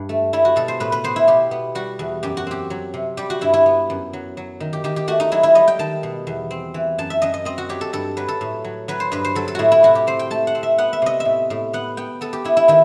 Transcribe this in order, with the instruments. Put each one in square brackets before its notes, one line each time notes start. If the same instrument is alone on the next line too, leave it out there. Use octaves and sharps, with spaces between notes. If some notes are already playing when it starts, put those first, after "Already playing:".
Already playing: [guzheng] G2
A3
G3 E4
F#4
B2 A4
C5
A2 B4
B4
B3 C5
E4
B2 G4
B3
G3 F#4
E2
F#2 G4
F#4
C4 G4
F#3
C3
G3 G4
F#4
G2 E4
E4
B3
F#2
F#3
F#3
D#3
G4
D#3 G4
G4
A3 F#4
D#4
F#3 E4
E4
G3 D#5
G5
D#3 A5
B2
E2
C4
E3
F#2 A5
E5
F#2 D#5
D#5
C4 D#5
F#4
F#3 G4
A4
G2 A4
F#3 B4
A4
A2
F#3
F#3 B4
C5
G2 B4
C5
F#3 A4
A4
A2 E4 F#4
E4
C3 F#4
G4
C4 C5
G5
A3 A5
F#5
C4
E5
B3 F#5
E5
C3 D#5
E5
A2
A2
B3 F#5
B3 G5
B3 A4
G4
B3 E4
E4
D#3 E4